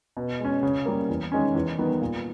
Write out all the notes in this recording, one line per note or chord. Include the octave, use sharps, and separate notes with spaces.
B2
G#3 C#4
C#3
G3 A#3
E2
D#3 G#3 C#4
E2
D#3 G3 B3
A#2